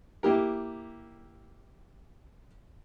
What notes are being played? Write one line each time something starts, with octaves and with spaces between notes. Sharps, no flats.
A#3 E4 G4 A#4